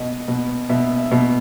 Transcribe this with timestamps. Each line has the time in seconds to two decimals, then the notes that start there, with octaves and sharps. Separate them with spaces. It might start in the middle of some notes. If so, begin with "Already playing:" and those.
Already playing: B2 D#5
0.28 B2
0.69 B2 E5
0.97 E5
1.11 B2